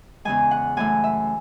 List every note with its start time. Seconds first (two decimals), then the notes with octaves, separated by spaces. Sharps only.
0.25 E2 C#3 E3 G#3 G#5
0.51 F#5
0.77 F#2 E3 A3 G#5
1.04 E5